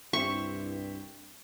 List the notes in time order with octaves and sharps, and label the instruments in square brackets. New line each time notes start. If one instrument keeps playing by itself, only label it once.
[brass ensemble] C2 G2 [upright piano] C4 E4 G4 [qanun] C#6